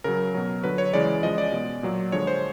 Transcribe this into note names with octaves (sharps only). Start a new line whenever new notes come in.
C#3 F#3 A#4
B2 F#3
D3 F#3 B4
C#5
C#3 E3 G#3 D5
C#3 F3 G#3 D#5
D5
B2 G#3
A#2 F#3
D3 F3 G#3 C#5
C5